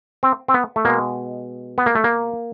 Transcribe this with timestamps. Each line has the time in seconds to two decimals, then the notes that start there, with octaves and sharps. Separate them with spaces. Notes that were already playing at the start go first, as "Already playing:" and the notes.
0.23 C4
0.48 C4
0.54 B3
0.76 A3
0.85 B2 G#3 A#3
1.78 B3
1.86 A#3
1.95 A3
2.04 A#3